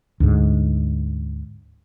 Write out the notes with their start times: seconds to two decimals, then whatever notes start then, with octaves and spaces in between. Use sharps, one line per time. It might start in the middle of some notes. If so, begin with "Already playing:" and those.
0.20 D2 G#2